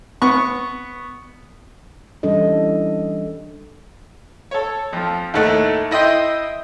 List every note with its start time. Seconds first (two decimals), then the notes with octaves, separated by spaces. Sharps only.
0.22 B3 C#6
2.23 E3 G3 C#4 D4 A4 D#5
4.51 A4 C#5
4.93 F2 F3
5.34 D#2 A2 A3 F#5
5.91 E4 D#5 G5 C6